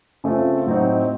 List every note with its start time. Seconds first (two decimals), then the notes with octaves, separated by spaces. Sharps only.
0.24 C#3 A3 C4 F4
0.66 A2 F#3 C4 D#4